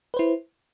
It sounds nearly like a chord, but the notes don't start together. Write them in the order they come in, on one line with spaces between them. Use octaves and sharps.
B4 C5 E4